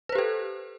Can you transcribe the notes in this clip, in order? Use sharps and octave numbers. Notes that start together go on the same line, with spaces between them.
G4 A4 B4 C5